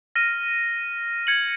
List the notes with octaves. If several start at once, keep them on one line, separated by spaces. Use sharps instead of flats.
F6 A#6 D#7
G#6 C#7 F#7